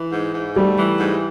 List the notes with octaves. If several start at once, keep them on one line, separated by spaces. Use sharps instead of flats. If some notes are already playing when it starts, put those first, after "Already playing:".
Already playing: E3
G#2
G#2
G3 A3
E3
G#2